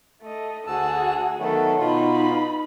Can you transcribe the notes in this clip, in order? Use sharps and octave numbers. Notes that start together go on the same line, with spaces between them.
A3 D#5
D2 F#4 G#4 A5 E6
D#3 F#3 A3 B3 A4
B2 D#4 F4 B5